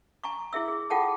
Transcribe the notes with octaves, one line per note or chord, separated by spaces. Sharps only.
G#5 A#5 C#6
E4 G#4 E5 E6
G#4
F4 G#4 A4 F#5 G5 A5